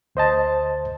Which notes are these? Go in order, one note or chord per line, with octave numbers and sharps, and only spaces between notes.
D2 C5 D#5 A5